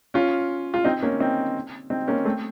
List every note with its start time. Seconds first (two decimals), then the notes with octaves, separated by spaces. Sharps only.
0.14 C#4 F4
0.74 F4
0.85 C4 D#4
1.02 A#3 C#4
1.20 C4 D#4
1.90 C4 D#4
2.08 A#3 C#4
2.25 A3 C4